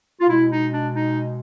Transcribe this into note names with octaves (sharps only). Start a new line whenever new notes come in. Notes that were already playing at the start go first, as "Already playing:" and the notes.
F4
B2 G#3 E4
D#4
D4
D#4